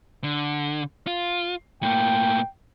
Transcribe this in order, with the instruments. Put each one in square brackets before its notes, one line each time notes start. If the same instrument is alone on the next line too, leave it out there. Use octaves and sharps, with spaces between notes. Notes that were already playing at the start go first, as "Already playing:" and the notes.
[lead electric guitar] D3
F4
[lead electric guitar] A2 A#3 [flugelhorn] G5